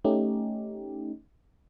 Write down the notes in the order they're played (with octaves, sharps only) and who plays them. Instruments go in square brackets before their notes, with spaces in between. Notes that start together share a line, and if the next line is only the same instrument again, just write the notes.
[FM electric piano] A3 C#4 D#4 G4